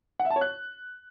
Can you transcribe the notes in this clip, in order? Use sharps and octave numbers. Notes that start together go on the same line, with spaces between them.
F#5
E5
A5
C#5
F#6